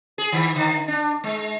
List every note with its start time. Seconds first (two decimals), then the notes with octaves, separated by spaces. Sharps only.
0.18 G#4
0.32 D#3
0.56 D3
0.88 D4
1.24 G#3